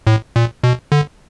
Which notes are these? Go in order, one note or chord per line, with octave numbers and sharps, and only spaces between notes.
A2
A#2
B2
D3